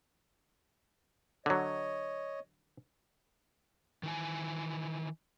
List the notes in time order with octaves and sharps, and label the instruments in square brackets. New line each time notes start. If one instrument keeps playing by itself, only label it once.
[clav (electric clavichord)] D3 F#3 [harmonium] C#5 D#5
[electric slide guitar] D#3 E3 G#5